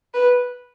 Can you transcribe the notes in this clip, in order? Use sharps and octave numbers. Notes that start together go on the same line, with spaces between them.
B4